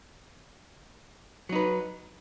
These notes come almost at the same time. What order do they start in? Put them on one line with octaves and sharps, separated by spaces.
F#3 D#4 B4